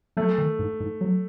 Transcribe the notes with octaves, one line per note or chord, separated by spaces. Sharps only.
F#3 A3
D#3
G#2
G#2
F#3